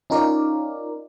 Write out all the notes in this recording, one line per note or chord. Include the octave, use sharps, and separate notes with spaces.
C#4 D#4 F4 A#4 D5